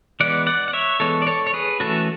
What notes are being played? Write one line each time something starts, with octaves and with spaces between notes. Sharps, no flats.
E3 G#3 B3 D5 F#5
D5 F#5
F#5
C#5 E5
E3 G#3 B3 A4 C#5
D5
A4 C#5
C#5
G#4 B4
E3 A3 C#4 F#4 A4